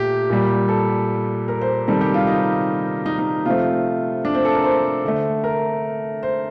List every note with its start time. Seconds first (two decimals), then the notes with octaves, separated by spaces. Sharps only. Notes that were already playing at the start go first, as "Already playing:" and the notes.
Already playing: A#2 A3 G4
0.30 A#2 G3
0.69 A4
1.48 A#4
1.61 C5
1.88 C3 D#3 G3 A4
2.01 G4
2.14 F4
2.27 D#4
3.06 D#4
3.19 D#4
3.45 C3 F3 A3 F4
4.25 D4
4.35 C4
4.45 A4
4.55 A#4
4.64 C5
5.04 D3 A3
5.44 A#4
6.23 C5